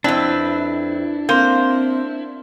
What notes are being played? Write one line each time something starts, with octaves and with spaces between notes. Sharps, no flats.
F2 C4 D4 E4 B4
A#3 C4 C5